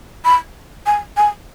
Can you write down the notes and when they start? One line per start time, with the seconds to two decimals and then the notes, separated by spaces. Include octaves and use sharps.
0.25 B5
0.86 G#5
1.17 G#5